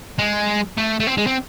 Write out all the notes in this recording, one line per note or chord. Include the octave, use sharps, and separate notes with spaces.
G#3
A3
A3
C4
G#3
C4